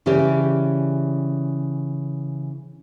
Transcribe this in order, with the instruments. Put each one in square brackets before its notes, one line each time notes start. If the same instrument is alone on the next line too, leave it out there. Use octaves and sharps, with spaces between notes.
[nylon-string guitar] C#3 E3 C#4 G4 D5